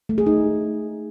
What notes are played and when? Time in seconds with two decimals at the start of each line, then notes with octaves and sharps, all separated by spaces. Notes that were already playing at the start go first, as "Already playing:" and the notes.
0.09 A3
0.18 G#4
0.26 D#4